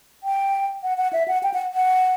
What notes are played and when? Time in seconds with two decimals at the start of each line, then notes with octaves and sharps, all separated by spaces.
0.23 G5
0.83 F#5
0.98 F#5
1.13 E5
1.28 F#5
1.43 G5
1.54 F#5
1.73 F#5